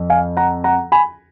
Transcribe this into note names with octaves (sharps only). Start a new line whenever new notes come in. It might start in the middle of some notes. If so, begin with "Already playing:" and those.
Already playing: F2
F5 G#5
F#5 A#5
F#5 A#5
G#5 B5